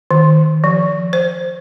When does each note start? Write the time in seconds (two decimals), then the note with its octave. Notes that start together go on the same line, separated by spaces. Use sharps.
0.11 D#3
0.64 F3
1.13 C5